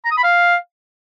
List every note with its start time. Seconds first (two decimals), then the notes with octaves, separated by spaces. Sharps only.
0.05 A#5
0.11 D#6
0.18 B5
0.24 F5